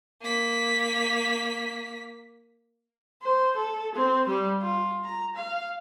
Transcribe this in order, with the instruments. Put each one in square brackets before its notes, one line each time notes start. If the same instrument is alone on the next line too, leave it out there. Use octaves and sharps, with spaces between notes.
[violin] A#3 B6
[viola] C5
A4
C4
G3
F4
A#5
F5